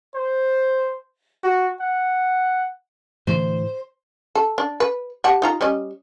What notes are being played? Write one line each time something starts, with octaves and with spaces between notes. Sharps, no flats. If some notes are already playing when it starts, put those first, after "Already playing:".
C5
F#4
F#5
A2 D3 E3 C5
A4
D4
B4
G4 F#5 A5
D#4 F4 A#5
G3 C#4 D#5